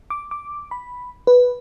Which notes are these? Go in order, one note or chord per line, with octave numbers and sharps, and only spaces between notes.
D6
D6
B5
B4